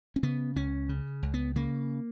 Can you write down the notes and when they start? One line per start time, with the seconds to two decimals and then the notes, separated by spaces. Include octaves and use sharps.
0.16 C#4
0.23 C#3 B3
0.56 C#2 C#4
0.89 C#3
1.23 C#2
1.34 B3
1.56 C#3 A#3